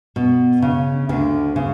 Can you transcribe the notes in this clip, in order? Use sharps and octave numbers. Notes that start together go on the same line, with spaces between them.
B2
C#3
D2 D3
C#3